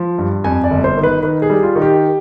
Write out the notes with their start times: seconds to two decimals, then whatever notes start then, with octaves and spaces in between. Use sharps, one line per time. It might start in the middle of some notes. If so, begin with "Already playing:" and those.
Already playing: F3
0.18 G2
0.44 F2 G#5
0.64 D5
0.71 G1
0.84 C5
0.97 D#3
1.03 B4
1.23 D#3 B4
1.42 G#4
1.50 G3
1.63 F4
1.76 D#3
1.82 G4